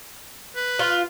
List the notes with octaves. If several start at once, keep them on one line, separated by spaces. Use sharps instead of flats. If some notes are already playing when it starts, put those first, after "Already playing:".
B4
F4